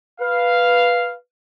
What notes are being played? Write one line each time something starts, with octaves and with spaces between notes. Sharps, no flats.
B4 F5